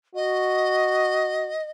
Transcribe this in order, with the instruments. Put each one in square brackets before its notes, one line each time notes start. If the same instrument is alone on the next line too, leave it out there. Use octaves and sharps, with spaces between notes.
[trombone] F#4 [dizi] D#5